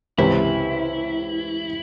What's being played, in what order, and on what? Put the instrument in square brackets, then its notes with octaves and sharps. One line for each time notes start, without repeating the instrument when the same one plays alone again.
[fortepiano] C#2 C3 E3 C4 [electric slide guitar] E4